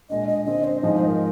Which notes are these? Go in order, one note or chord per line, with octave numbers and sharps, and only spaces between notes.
A#2 G#3 D4 D#5
D#5
D3 G#3 C4 D#5
C5
G#2 F3 G#3 D#4 D#5
C5
A#4